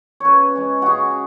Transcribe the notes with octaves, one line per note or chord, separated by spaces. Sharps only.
C#3 B4 C#5
G#3 C#4
C#3 F#4 G#4